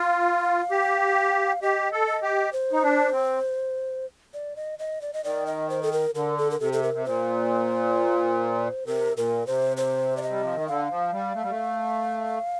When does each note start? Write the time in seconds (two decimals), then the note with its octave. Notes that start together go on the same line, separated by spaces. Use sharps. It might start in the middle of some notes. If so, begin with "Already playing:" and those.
Already playing: F4 F5
0.71 G4
1.62 G4 D#5
1.92 A4
2.07 D#5
2.23 G4
2.53 C5
2.72 D#4
2.83 D4
3.12 C4
4.34 D5
4.56 D#5
4.79 D#5
5.02 D5
5.13 D#5
5.24 D#3 D5
5.47 D#5
5.70 C5
5.83 A4
5.93 A#4
6.15 D3 A#4
6.38 A4
6.51 A#4
6.60 C3 A4
6.73 A4
6.83 A#4
6.94 C3
7.05 A#2 C5
8.86 C3 A#4
9.16 A#2 A#4
9.47 C3 C5
9.77 C5
10.17 D5
10.22 D#5
10.30 G3
10.43 F3
10.55 D#3
10.68 D3 F5
10.91 F3
11.12 G3
11.35 A3
11.43 G3
11.50 A3